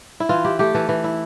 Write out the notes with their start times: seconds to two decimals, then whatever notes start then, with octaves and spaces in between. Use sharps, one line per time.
0.20 E4
0.29 E3 F4
0.44 E4 G4
0.59 A3 G4
0.74 E3 A4
0.89 E3
1.04 E4